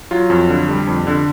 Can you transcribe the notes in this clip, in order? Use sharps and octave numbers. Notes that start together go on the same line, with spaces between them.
F#3 F4
F2
D3
G3
F2
D3